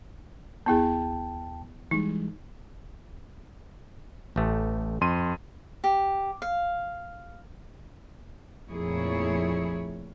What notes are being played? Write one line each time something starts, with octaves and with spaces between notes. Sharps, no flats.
D#2 B3 E4 G#4 G5 A5
E3 G3 G#3 D#4
A1 A3
F2 C6 D#7
G4
F5
F2 A#2 A3 E4 G#4 C#5